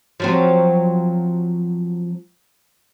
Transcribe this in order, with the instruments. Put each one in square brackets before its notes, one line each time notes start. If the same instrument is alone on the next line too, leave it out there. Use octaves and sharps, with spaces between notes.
[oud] F3 F#3 C4